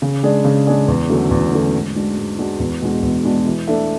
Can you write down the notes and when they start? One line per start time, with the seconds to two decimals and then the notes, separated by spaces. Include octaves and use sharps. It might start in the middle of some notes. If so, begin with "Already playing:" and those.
0.02 C#3
0.23 G#3 D4 G#4 D5
0.45 C#3
0.66 G#3 D4 G#4 D5
0.88 E2
1.09 D3 F#3 A3 C#4
1.31 E2
1.53 D3 F#3 A3 C#4
1.74 G#2
1.96 G#3 D4 F#4
2.17 G#2
2.38 G#3 D4 F#4
2.60 E2
2.81 B2 G#3 D4 F#4
3.03 E2
3.25 B2 G#3 D4 F#4
3.46 E3
3.68 A3 D4 A4 E5